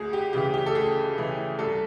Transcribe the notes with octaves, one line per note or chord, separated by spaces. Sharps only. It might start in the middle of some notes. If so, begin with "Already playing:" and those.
Already playing: D2 G#4
G4
C#3 E3 G4
G4
A4
D2 G#4
C#3 E3
C2 A4